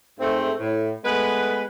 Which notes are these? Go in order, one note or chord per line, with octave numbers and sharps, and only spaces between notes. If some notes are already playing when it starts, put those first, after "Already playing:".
G#2 A3 C4
A2
G#3 A3 B3 B4